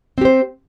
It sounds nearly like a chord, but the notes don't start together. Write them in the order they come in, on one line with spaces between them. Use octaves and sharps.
C4 G4 C5